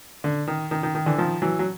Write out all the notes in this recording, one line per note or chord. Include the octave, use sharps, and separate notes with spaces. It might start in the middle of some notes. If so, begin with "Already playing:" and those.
D3
D#3
D#3
D#3
D#3
D3 E3
D#3 F3
E3 F#3
F#3